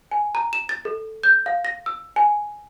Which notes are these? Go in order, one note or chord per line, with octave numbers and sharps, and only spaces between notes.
G#5
A#5
E7
A6
A4
G6
F5
A#6
E6
G#5